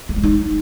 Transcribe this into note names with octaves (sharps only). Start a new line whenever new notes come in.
A3
G#3
D#4